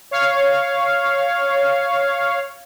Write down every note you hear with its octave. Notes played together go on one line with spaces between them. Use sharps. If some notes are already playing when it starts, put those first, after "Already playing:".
C#5 F5